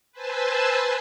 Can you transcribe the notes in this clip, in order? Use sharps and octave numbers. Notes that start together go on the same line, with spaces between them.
B4 C5 G#5 A5 E6